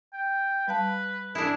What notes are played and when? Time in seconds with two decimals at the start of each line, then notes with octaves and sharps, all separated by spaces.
0.13 G5
0.68 G3 B4 F5 A5
1.35 D4 E4 G#4